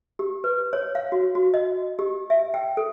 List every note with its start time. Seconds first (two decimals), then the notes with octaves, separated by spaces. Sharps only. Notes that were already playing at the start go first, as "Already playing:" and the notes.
0.19 G4
0.44 B4
0.73 C#5
0.95 F5
1.12 F#4
1.35 F#4
1.54 D#5
1.99 G4
2.30 E5
2.54 G5
2.77 A4